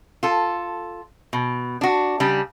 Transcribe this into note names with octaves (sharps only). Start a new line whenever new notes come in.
F4 A4
B2
D4 F#4
C#3 G3 D4